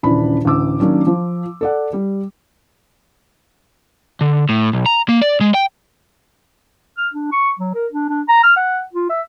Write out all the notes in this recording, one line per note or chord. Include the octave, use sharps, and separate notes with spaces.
D#1 C#3 E3 D4 B5
A1 D2 D6 E6
D#3 F#3 A#3 C#4 D4
F3
A4 D5 F#5
G3
D3
A2
B1
A#5
A#3
D5
G#3
G5
F6
D4
C#6
F#3
A#4
D4
D4
A#5
F6
F#5
F4
E5